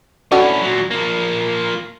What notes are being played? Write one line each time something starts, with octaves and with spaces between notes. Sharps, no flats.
C#4 D4 E4 F#4 A4
A#2 F#3
F3 A#3